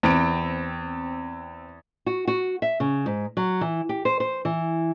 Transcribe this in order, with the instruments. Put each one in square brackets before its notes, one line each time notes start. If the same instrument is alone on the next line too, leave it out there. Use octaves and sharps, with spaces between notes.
[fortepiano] E2 [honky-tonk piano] C4 D7
[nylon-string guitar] F#4
F#4
E5
C#3
G#2
F#3
E3
G4
C5
C5
E3